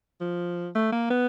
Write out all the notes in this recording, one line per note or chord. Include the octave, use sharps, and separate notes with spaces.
F3
A3
A#3
B3